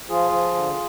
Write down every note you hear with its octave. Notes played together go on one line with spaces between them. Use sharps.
F3 F4 G#4
F3
D3